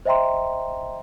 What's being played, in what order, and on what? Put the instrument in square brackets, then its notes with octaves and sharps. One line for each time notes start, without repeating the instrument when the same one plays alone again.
[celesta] C5 D#5 E5 G5 A#5 C6